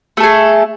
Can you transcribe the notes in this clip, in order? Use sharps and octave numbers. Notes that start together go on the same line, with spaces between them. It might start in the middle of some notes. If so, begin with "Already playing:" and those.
A3 G#4 A4